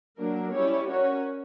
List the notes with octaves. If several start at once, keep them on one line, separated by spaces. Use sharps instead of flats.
F#3 A#3 D4 A#4
G3 C#4 E4 G4 C#5
C#4 F#4 A#4 C#5